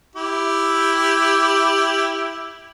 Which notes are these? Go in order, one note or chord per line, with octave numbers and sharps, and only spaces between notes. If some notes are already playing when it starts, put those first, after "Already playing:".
E4 G4